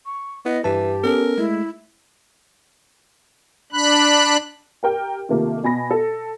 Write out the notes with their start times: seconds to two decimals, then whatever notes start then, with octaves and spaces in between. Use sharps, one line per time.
0.06 C#6
0.46 B3 E4 D#5
0.64 G2 E3 G4 A5
1.04 B3 C#4 A4 A#4
1.38 G#3 A3 E4
3.73 D4 B5 F#6
4.83 G4 A#4 G5
5.29 C3 D#3 A3 A#3 F4
5.64 B2 G#5 B5 A#6
5.91 A4